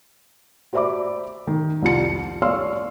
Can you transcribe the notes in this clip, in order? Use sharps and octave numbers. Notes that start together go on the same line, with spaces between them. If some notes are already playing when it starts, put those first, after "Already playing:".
F#4 C5 D5 E5 B5 D6
D#3
C2 F2 F4 C#7
C#5 D5 F5 C6 E6 F6